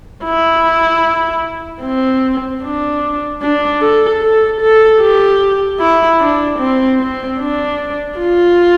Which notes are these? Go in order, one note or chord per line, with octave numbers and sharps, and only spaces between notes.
E4
C4
D4
D4
A4
A4
A4
G4
E4
D4
C4
C4
D4
F4